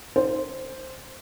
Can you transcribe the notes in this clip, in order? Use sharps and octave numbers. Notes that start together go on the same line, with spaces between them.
C5